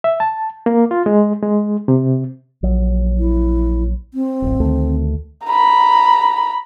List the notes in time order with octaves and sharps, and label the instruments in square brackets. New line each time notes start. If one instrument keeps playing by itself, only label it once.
[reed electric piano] E5
A5
A#3
F4
G#3
G#3
C3
[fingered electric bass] A#1 F#3
[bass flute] E4
C4
[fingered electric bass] D1 A1
D2 D#3 A3
[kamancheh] A#5 B5